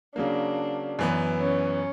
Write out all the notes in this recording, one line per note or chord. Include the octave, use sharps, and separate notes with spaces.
C#3 F#3 A#3 D4
F#2 E3 B3
C#4